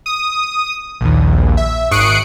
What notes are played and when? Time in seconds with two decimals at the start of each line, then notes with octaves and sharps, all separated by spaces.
0.06 D#6
1.01 A#1 D#2
1.57 E5
1.91 G#1 C#6 D#6 F#6 C7 D7